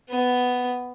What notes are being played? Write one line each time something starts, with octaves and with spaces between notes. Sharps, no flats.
B3